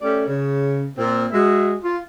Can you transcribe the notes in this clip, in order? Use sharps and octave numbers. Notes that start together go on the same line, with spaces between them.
A3 C#4 G4 D5
C#3
A#2 C4
G#3 F#4 G#4 E5
F4